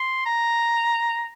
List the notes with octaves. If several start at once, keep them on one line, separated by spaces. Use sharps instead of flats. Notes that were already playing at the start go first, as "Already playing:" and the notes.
Already playing: C6
A#5